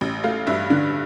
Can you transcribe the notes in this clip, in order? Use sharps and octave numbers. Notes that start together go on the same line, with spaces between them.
A1
A3 F5
G2 E5
D3